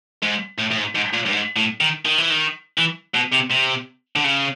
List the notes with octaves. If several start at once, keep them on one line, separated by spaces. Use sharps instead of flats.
G#2
A2
A2
G#2
G#2
A#2
G2
G#2
A2
D#3
D#3
E3
D#3
E3
B2
C3
C3
D3
C#3